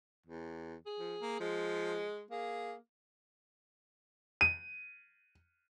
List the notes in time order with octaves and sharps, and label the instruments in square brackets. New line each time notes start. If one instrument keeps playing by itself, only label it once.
[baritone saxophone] E2
[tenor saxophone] G#4
[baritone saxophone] F3
A#3
[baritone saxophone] F3 [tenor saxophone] G#3
[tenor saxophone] A#3 [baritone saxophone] G#4
[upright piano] D#7